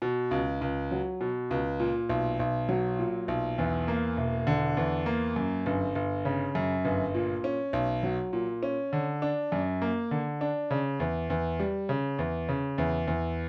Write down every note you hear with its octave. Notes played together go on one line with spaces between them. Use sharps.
B2
C#2
C#2
F#3
B2
C#2
A#2
B1
B1
F#3
A#2
B1
E2
A#3
E1
D3
E2
A#3
F#2
G1
G1
C#3
F#2
G1
A#2
C#4
B1
F#3
A#2
C#4
D3
D4
F#2
A#3
D3
D4
C#3
E2
E2
G3
C#3
E2
C#3
E2
E2